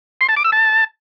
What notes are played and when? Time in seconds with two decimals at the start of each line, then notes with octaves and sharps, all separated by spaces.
0.21 C6
0.29 A5
0.37 D6
0.44 E6
0.52 A5